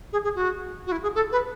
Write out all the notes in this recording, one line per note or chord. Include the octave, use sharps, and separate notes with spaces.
G#4
G#4
F#4
F#4
E4
G#4
A4
B4